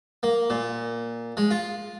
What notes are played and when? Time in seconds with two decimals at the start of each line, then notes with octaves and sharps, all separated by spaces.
0.23 A#3
0.50 A#2
1.37 G#3
1.51 F4